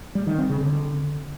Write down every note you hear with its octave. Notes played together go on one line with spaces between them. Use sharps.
G3
D#3
C4
C#3
D3